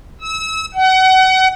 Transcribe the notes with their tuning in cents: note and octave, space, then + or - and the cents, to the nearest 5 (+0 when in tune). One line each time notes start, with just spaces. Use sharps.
E6 -30
F#5 +30